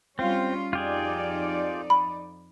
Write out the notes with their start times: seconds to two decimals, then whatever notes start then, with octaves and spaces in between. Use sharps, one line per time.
0.19 G3 C4 C#4 F4
0.73 F2 D#4 F4 G4 G#4 D5
1.90 B5